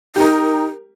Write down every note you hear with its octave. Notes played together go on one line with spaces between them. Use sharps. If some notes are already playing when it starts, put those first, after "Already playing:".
D#4 G4 A#4